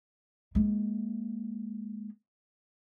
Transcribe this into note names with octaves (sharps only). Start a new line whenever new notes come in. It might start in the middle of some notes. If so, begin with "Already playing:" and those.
G#3 A#3